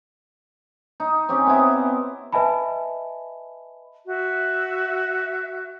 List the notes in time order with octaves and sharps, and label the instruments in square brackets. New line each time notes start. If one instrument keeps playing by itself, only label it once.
[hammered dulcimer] D#4
C4 C#4 G4 G#4
B3 C4 E4
[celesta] B4 D#5 E5 G#5 A5 B5
[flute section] F#4 E5